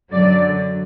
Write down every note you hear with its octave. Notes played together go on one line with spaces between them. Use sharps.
F#2 D3 F#3 D5